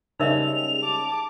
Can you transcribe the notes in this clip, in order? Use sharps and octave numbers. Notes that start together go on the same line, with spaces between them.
C#3 G3 G#3 D#4 A#4 E5 F7
A5 D6